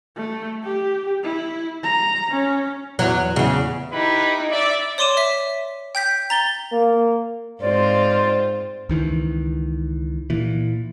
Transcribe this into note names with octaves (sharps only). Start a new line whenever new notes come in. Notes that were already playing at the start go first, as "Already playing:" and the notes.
A3
G4
E4
A#5
C#4
E2 F#3
E2 C#3
D#4 E4 G4 B4 B5
D5 E5 E6
C#5 D5 C6 D6 D#7 E7
E5 B6
G5 G6 B6
A#5 A6 G7
A#3
G#2 C4 F4 C5 D5
C#2 D#3 E3
A#2 E3